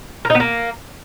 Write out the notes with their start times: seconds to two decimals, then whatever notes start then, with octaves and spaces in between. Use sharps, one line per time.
0.25 A#4
0.30 D#4
0.35 B3
0.40 A#3